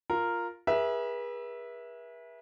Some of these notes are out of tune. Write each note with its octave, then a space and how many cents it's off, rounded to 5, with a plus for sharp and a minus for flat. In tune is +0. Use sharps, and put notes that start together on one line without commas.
F4 +0 A#4 -5
G#4 -20 B4 -40 E5 +0